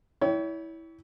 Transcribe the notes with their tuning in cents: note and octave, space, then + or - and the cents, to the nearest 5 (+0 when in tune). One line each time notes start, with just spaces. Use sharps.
E4 -15 C#5 +35 G5 -10